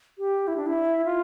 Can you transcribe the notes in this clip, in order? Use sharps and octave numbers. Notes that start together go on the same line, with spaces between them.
G4
E4
D4
E4
F4